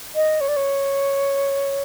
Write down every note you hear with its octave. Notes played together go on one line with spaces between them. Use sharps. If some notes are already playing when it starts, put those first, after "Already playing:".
D#5
C#5
D5
C#5